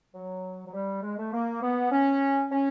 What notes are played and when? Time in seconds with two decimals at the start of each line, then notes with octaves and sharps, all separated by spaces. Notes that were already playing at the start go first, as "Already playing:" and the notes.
0.14 F#3
0.67 F#3
0.73 G3
1.02 G#3
1.18 A3
1.32 A#3
1.62 B3
1.91 C#4
2.52 C#4